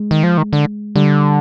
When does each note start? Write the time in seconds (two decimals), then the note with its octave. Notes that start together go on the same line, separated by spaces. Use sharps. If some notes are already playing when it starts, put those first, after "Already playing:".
Already playing: G#3
0.11 D#3
0.23 F3
0.37 D#3
0.53 D3
0.96 D3 G3